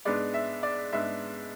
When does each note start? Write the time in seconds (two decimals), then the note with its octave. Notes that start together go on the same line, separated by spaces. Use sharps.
0.05 G#2 G#3 B3 D4 D5
0.34 E5
0.63 D5
0.92 G#2 G#3 B3 D4 E5